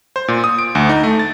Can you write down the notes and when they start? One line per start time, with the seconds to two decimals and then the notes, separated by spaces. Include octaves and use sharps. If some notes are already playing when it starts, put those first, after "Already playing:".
0.16 C5
0.28 A#2
0.44 D#6
0.59 D7
0.75 D2
0.89 D#4
1.03 A3
1.19 A6